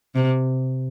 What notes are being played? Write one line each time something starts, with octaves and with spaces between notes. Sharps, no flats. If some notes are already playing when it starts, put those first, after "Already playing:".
C3